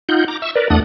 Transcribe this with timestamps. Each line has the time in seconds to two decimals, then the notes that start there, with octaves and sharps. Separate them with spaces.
0.09 D#4 F4 F#5 G6
0.28 A#5 D6
0.42 E5 C#6 E6
0.55 A#4 B4 D5
0.70 E2 A3 D4 F#5 D#6